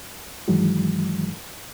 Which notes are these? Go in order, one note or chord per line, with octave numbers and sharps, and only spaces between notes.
G2 D#3 E3 F#3 G#3